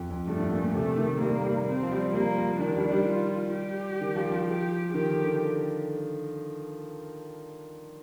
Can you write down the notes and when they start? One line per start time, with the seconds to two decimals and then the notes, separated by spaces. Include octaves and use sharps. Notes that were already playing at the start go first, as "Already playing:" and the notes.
Already playing: F2
0.10 F2
0.27 G2 A3
0.40 A2
0.51 A#2
0.63 A#2
0.74 C3 A3
0.98 D#3
1.21 G3 A#3
1.44 G3
1.68 C4
1.82 F3
1.91 G3
2.14 G3 A#3
2.37 F3
2.60 D#3 D4
2.76 G3
2.91 G3
3.07 F4
3.54 G4
4.01 D#3
4.15 F3
4.31 F3
4.47 G4
4.93 D#3 G4
5.10 D3
5.25 D3